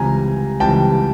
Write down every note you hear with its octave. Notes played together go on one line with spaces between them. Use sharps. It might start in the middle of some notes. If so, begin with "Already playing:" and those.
Already playing: C#2 C3 E3 G3 G#5 A#5
C#2 C3 E3 G3 G5 A5